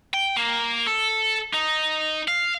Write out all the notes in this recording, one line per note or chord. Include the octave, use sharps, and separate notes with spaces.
G5
A#3
A4
D#4
F5